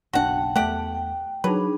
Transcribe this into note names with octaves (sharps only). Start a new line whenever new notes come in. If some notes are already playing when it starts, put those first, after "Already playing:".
F#1 B1 D4 F#4 F#5 G5 A5
E2 A3 G4 F#5
G5
F#3 D4 D#4 G#4 B4